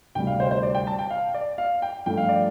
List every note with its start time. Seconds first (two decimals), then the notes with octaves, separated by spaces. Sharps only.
0.15 D2 C3 G3 G5
0.27 F5
0.40 C5
0.51 C5
0.63 D5
0.75 G5
0.87 A5
0.99 G5
1.10 F5
1.34 D5
1.58 F5
1.82 G5
2.06 G2 F3 A3 G5
2.17 F5
2.29 D5